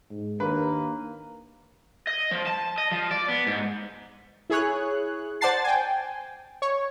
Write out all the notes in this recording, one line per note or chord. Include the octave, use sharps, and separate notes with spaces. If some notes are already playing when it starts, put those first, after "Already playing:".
G#2
D#2 A#3 D4 B4
D#5
F3
A5
D#5
F3
D5
B3
G#2
E4 G#4 C#5 F#6
C5 D5 F#5 A5 A6 C7
G5 G#5
C#5